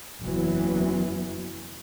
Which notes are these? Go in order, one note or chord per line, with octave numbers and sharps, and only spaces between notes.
F#1 E2 E3 F#3